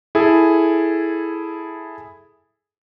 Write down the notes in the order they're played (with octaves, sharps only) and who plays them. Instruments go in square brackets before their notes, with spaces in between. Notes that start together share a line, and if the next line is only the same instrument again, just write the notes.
[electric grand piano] E4 G#4 A4